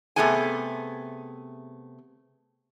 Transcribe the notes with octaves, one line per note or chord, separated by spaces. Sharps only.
C3 F3 A3 B3 G#4 G#5